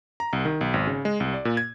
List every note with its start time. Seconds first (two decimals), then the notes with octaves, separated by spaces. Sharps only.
0.20 A#5
0.33 C2
0.45 D#3
0.61 B1
0.74 G#1
0.87 C#3
1.05 G#3
1.20 C2
1.34 D5
1.45 A#2
1.57 G#6